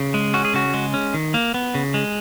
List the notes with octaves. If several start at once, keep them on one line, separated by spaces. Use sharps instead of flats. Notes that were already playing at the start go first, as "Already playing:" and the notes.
Already playing: C#3
G#3
C#4 F#4
G#4
C#3 F#4
G#3
C#4
D#3
A#3
B3
C#3
G#3